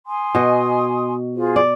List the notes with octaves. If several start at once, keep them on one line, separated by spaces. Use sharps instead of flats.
G#5 C6 D#6
B2 D#5
F4 G#4 C5
D5